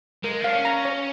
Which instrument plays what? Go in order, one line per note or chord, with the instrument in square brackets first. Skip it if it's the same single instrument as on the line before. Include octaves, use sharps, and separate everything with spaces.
[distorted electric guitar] G#3 [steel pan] A#4
[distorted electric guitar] D4 [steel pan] F5
[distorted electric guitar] C#4
[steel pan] A#5
C#5